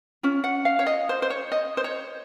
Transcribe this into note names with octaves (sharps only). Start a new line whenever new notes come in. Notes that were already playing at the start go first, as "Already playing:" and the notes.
C#4 F4
F#5
F5
C#5
D#5
C5
C5
C#5
D#5
C5
C#5